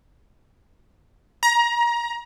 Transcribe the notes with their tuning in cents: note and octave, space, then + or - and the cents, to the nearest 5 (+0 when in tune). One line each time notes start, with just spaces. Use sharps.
A#5 +25